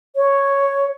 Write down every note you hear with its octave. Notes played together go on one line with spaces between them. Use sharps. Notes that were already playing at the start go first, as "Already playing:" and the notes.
C#5